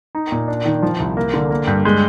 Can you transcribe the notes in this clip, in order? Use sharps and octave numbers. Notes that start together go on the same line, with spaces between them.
D#4
A#2
D4
D#3
F3
C2
A#3
D3
A#3
G2
G#3